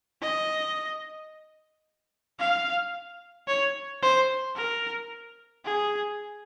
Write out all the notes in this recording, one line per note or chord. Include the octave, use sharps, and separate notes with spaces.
D#5
F5
C#5
C5
A#4
G#4